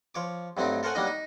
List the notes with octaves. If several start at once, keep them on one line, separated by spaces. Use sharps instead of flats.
F3 C#5 D6
G2 F#3 A3 C4 D#4
A4 A#4 C5 C#5 F#5 G#5
F#3 G3 A#3 D4 D#4 D#5
D#4